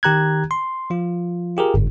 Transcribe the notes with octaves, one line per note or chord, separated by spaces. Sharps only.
D#3 G4 A#5 F#6 G#6
C6
F3 F4
F4 G4 G#4 A#4
G1 G#2